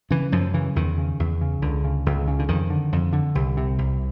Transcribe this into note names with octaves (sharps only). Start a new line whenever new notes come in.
C#3 E3
F#2 F3
C#3 E3
E2 D#3
C#3
E2
C#3
C#2 D3
C#3
C#2
C#3
D3
F2 D#3
D3
F2
D3
C2
C3
C2